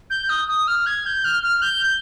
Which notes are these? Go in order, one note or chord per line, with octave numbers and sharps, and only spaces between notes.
G6
D#6
D#6
F6
G#6
G6
F6
F6
G6